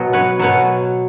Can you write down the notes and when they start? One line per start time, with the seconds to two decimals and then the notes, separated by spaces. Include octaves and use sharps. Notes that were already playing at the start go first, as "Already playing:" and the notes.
Already playing: B2 F#3 D#5
0.13 B4 C#5
0.39 B2 F#3 B4 C#5